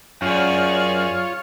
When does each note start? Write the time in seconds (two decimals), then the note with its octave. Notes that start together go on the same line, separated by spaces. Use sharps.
0.22 F#2 F4 G#4 C#5 D5